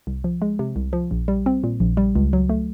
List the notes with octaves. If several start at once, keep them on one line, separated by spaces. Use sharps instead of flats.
C2
F3
G#3
C3
C2
F3
A#1
G3
C4
A#2
A#1
G3
C#2
F#3
A3